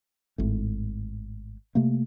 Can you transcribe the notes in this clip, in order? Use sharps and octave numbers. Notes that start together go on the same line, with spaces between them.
G#1 A2
C3 A3 A#3